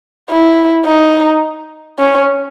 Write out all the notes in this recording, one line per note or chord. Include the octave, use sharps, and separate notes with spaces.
E4
D#4
C#4